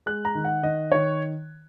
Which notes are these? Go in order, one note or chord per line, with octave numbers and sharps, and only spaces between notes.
G#3 F#6
A#5
D#3
F#5
D#3 D#5
D#3 C#5